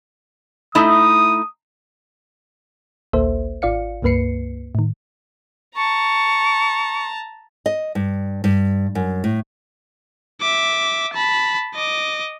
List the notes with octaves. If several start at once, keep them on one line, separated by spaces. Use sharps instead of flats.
A3 D#4 E4 D#6
A1 D2 A#3 A4 C5 E5
G#1 F4 D5 F5 C#7
C#2 G2 A#3 B4 C7 C#7
A2 D#3
A5 A#5 C#6
D#5
G2
G2
F#2
A2
E5 D6
A5 B5
D#5 D6